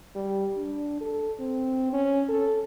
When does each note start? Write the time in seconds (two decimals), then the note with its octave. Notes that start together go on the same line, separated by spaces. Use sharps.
0.15 G3
0.57 D4
1.01 A4
1.40 C4
1.93 C#4
2.29 A4